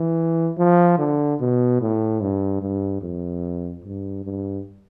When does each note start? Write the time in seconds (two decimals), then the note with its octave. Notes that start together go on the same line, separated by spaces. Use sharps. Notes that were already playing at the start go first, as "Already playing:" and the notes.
Already playing: E3
0.58 F3
0.98 D3
1.40 B2
1.81 A2
2.21 G2
2.62 G2
3.02 F2
3.84 G2
4.24 G2